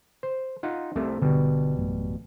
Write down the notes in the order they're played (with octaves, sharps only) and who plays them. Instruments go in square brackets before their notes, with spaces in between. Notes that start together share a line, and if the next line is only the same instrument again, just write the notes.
[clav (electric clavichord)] C5
D#4 F4 F#5
C2 C3 A3
[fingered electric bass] G#1 D3 [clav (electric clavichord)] B2 G3
[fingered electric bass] A1 F#2 A2